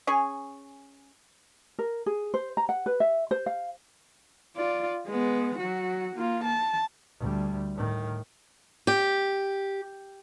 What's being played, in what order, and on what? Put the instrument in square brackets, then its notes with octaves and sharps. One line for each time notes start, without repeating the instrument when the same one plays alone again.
[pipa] C#4 G#4 G#5 C#6
[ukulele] A#4
G#4
C5
A#5
F#5
B4
E5
C5
F5
[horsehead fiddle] F4 D5
G#3 B3
F#3 F#4
A#3 F4
A5
[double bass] D2 G3
A2 D#3
[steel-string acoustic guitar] G4